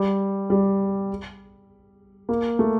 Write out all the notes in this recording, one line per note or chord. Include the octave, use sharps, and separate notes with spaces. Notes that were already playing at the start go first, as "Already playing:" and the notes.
Already playing: G3
G3
A#3
A3